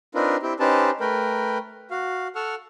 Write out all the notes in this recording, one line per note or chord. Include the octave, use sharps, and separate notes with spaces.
C4 D4 D#4 F4 A#4 B4
C4 E4 G4
C#4 D#4 G4 B4 C5 A5
A3 A#4 B4 G5
F#4 F5
A4 F#5 C#6 E6 F6